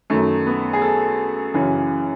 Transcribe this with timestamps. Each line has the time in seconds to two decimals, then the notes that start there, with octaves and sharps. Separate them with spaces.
0.10 F#2 D#3 A3
0.46 B3
0.73 G#4
0.82 A4
1.54 F#2 C#3 E3